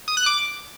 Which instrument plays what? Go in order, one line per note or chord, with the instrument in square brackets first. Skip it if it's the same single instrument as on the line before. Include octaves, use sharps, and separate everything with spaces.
[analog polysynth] D#6
F#6
D6